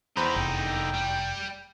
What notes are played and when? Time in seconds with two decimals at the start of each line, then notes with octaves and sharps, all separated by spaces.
0.17 E2 D3 D#4 C5 B5
0.36 F1 G5
0.94 G3